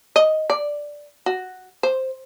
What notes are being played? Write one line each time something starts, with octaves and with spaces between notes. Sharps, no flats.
D#5
D5
F#4
C5